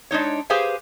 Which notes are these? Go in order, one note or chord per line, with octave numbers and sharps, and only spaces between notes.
G#3 D4 D#4 C#5
G4 G#4 B4 C5 F5 G#5